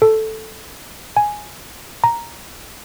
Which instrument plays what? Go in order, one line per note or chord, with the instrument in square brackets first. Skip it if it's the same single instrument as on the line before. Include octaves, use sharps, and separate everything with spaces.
[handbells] A4
G#5
A#5